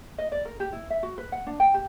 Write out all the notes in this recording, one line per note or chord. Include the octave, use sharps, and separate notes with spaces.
D#5
D5
A#4
G4
E4
E5
F#4
B4
F#5
D4
G5
G4